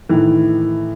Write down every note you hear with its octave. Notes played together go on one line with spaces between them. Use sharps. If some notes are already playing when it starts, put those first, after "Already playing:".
A2 D#3 E3